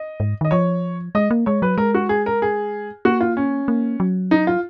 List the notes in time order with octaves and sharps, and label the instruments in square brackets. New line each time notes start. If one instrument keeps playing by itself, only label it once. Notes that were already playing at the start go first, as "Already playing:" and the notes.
Already playing: [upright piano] D#5
[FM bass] G#2
[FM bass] D#3 [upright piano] D#5
[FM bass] F3 [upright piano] C#5
[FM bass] G#3 [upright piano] D#5
[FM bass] A#3
[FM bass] G#3 [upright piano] C#5
[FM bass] F#3 [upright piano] B4
[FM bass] G#3 [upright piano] A#4
[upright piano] F#4
G#4
A#4
G#4
[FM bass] A#3 [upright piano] F#4
[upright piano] F4
C#4
[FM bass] A#3
F#3
[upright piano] D#4
F4